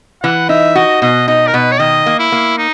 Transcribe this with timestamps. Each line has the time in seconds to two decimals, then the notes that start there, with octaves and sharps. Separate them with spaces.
0.23 E3 F#5
0.49 D#4 E5
0.75 F#4 D#5
1.02 B2 D#5
1.28 D#4 D#5
1.47 A#4
1.54 B2 B4
1.72 C#5
1.80 D#3 D#5
2.06 A#3
2.19 E4
2.32 A#3
2.58 D#4